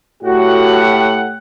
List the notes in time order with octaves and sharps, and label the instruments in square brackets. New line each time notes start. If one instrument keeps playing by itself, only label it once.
[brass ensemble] A2 G4 F#5 [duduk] F#4